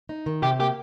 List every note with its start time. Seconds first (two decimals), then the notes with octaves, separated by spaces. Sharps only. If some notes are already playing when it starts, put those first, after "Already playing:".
0.09 D#4
0.26 D#3
0.42 C3 G4
0.60 A#3 G4